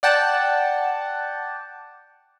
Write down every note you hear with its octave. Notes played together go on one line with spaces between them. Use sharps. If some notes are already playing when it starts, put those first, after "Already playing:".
D5 F#5 G5 A5